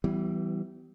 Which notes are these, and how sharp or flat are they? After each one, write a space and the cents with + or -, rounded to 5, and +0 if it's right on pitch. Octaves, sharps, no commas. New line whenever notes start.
E3 +0 G3 -25 B3 +30